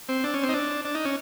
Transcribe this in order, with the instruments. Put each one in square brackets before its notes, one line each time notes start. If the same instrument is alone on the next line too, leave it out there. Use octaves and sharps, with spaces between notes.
[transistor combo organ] C4
D4
C#4
C4
D#4
D4
D4
D#4
C#4